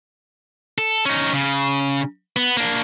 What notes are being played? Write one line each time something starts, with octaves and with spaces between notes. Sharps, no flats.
A4
C#4 D#4
C#3
B3
A#3 D4